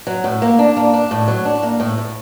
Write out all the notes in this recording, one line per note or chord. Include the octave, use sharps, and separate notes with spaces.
F#3
A2
A#3
D4
A#3
D4
A2
F#3
D4
A#3
A2
A2